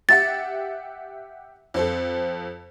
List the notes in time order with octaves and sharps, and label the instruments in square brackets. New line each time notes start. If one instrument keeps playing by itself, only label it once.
[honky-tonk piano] G4 E5 F#5 [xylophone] A6
[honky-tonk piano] F2 C4 A4